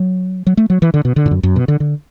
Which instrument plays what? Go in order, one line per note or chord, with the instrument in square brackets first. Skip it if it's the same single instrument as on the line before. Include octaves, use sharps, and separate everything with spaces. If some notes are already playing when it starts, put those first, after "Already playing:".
Already playing: [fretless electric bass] F#3
F#3
A3
F#3
E3
D3
B2
D3
A2
F#2
F#2
B2
D3
D3